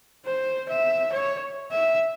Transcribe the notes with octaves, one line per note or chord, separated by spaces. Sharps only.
C5
E5
C#5
E5